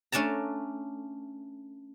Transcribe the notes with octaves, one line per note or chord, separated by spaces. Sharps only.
A3 C#4 D4 A5 A#5